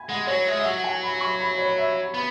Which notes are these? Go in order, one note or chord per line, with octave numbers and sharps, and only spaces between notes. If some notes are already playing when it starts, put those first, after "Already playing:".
Already playing: G#5 B5
G#3 F#5
F#3 C#5
G#3 E5
E5
F#3 F#5
G#5
B5
C#6
B5
C#5
E5
B3 B5